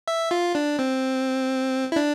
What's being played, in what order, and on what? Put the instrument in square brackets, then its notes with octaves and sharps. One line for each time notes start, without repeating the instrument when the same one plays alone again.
[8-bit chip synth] E5
F4
D4
C4
E4
D4